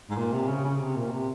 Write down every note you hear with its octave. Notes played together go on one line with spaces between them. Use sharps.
G#2
A#2
C3
C#3
C#3
C3
A#2
C3